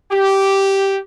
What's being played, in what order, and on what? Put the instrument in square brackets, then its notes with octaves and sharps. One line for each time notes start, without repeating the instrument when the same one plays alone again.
[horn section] G4